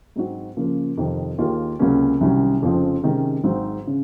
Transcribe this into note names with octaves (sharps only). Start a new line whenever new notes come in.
G#2 F#3 C4 D#4 F#4
C#3 F3 A#3
F2 C3 D#3
D#2 D#3 A#3 F4 G#4
C#2 C3 F#3 A#3 C#4
C2 C3 D#3 F#3 C#4
F1 F2 C#3 F3 C4
C3 D#3 G#3 C#4
G#1 G#2 F#3 C4
C#3